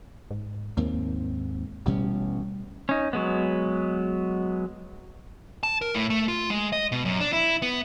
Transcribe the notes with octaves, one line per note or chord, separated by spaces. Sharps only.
G#2
D#2 G#2 A#3 C4
A1 B2 G3 C#4
C#4 D#4
F#3 G#3 B3
A5
A#4
A2
A3
F4
G#3
D#5
B2
F#2
D4
E4
B3